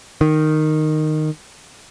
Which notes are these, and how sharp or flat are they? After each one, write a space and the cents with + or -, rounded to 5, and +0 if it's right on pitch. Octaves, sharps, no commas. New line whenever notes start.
D#3 -10